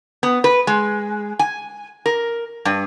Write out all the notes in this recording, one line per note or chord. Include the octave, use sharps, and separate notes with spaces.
B3
B4
G#3
G#5
A#4
G2